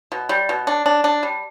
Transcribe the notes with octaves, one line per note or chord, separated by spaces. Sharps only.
B2
G3
B2
D4
D4
D4
G3